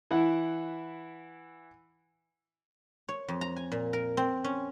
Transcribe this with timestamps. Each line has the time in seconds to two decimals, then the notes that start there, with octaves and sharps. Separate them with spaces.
0.11 E3 E4 F#5
3.09 C#5
3.28 F2
3.41 A#5
3.56 G#5
3.72 A#2
3.93 A#4
4.17 C4
4.44 C#4